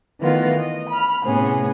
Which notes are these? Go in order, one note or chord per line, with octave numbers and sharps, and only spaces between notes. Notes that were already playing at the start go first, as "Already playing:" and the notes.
D#3 E3 A3 B3 F4
D#5
B5 F6
A2 C3 B3 C#4 G#4